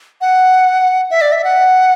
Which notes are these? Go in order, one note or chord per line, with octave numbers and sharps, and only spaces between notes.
F#5
E5
D5
E5
F#5